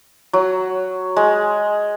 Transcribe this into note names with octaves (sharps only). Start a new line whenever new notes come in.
F#3
G#3